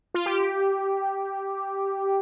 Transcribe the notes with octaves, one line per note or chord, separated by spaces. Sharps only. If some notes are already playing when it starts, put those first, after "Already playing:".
F4
G4